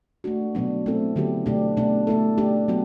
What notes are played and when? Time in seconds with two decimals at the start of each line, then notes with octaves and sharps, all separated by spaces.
0.24 A3 D4 F#4
0.55 B2 F#3 B3 D4
0.86 A3 C4 E4 A4
1.16 D3 F#3 B3 E4 G4
1.46 B2 A3 D4 G4
1.77 B2 A3 D4
2.07 A3 E4 A4
2.38 A3 D4 G4
2.68 F#3 B3